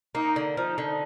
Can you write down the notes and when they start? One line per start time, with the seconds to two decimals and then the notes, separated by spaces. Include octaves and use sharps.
0.15 A#3 D#4
0.36 D3
0.57 F3 D#4
0.78 D3